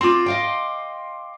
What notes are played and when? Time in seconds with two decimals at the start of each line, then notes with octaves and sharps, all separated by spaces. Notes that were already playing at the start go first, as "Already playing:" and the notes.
0.01 C4 F4 C6 D6
0.26 D#5 F5 G5